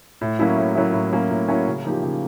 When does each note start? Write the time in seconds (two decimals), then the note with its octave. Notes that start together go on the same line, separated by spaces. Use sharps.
0.21 A2
0.39 F#3 A#3 C#4 E4
0.57 A2
0.75 F#3 A#3 C#4 E4
0.93 A2
1.12 F#3 A#3 C#4 E4
1.30 A2
1.48 F#3 A#3 C#4 E4
1.67 C#3
1.85 F3 A#3 D#4 G4
2.03 C#3